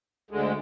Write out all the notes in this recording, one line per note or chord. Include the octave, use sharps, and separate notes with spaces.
D2 D3 G#3